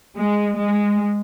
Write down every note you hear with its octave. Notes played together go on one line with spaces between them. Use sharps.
G#3
G#3